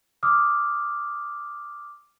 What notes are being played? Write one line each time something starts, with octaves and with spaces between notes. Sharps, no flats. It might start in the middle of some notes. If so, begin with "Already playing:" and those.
D6 D#6 F6